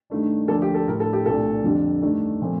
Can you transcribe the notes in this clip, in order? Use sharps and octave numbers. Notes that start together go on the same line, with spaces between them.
G2 D#3 A3 D4
D2 D3 F3 A#3 D4 A4
G4
A4
A2 G3 D4 A#4
A4
G4
C2 A#2 A3 D4 A4
F2 D3 G3 D4
G2 D#3 A3 D4
A#2 F3 A3 C4